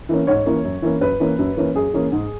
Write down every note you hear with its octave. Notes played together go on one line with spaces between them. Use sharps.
E3 A#3 C#4
G#2 C#5
E3 A#3 C#4
F#2
E3 A#3 C#4
F#2 B4
E3 A#3 C#4
F#2
E3 A#3 C#4
F#2 G#4
E3 A#3 C#4
G#2